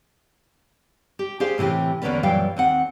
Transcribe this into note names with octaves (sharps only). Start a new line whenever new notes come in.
G4
G4 G#4 C5 F5
A2 C3 E3 C4 G4
E2 D3 A#3 B3 C#4 B4
F#2 A#2 E3 G3 F5 G5
D#2 C4 F#5